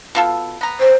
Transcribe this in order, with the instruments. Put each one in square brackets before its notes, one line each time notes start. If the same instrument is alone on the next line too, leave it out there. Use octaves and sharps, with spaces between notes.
[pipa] B2 F4 A4
B3 A#5
[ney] C5